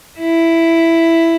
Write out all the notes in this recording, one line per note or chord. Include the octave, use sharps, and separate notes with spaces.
E4